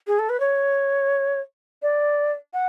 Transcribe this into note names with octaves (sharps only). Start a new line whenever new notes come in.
G#4
A4
B4
C#5
D5
F#5